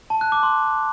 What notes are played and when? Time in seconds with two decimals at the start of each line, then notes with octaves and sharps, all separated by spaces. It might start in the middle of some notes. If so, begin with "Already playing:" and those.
0.10 A5
0.21 F#6
0.32 D6
0.43 C6